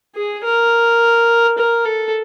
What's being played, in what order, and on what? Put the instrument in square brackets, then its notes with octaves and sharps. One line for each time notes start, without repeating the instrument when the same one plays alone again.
[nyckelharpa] G#4
A#4
A#4
A4